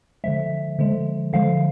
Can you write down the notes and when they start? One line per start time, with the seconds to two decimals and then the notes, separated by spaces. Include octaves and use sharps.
0.24 D3 F3 G#3 E5
0.79 D3 F3 G#3
1.33 D3 F3 G#3 F5